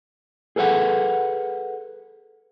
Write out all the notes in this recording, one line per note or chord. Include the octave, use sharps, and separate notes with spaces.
G#4 A4 B4 E5 F#5